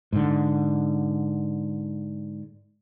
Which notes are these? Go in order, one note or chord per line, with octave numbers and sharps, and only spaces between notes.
G#2 D3